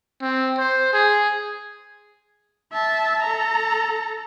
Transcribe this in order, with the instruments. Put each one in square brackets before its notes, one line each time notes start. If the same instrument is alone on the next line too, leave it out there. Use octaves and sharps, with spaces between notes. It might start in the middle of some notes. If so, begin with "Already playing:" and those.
[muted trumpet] C4
C5
G#4
[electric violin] E5 A5
A4 A#5